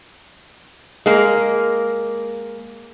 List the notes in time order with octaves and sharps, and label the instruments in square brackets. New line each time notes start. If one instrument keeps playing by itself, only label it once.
[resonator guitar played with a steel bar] G#3 A#3